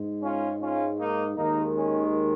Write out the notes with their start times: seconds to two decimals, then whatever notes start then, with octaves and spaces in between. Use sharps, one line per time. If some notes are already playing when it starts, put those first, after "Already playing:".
Already playing: G#2 G#3
0.22 C#4 F4
0.60 C#4 F4
0.97 A#3 D#4
1.35 D#2 D#3 G#3 A#3 D#4
1.74 C#4